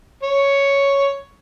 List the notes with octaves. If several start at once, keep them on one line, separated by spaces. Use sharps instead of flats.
C#5